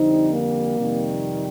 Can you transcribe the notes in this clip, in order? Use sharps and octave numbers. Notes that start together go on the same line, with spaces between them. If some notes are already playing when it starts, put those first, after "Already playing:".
Already playing: F2 D3 G3 C4 D#4
A#3
F2 C3 D#3 G3